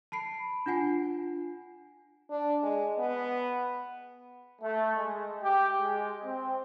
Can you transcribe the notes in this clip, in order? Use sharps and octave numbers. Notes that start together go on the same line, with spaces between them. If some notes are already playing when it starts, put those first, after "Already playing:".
A5 B5 C7 D7
D4 F4 F#5 G#5 C7
D4
G#3
B3
A3
G#3
G4
G#3
C4